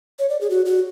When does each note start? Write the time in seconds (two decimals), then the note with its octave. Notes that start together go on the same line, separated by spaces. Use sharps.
0.19 C#5
0.30 D5
0.41 G#4
0.50 F#4
0.66 F#4